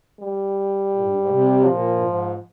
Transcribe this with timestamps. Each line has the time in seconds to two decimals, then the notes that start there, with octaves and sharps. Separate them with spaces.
0.20 G3
0.93 A#2
1.00 G#2
1.08 G2
1.16 G#2
1.29 C3
1.64 A#2 F3
1.96 G2
2.01 G#2